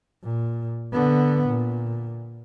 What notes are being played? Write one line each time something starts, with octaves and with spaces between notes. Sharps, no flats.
A#2
D3 B3
A#2